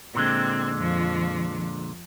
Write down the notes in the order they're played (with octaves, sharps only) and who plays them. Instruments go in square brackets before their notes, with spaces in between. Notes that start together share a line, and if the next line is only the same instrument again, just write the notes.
[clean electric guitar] A#2 D3 G#3 [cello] C4
[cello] F2 F3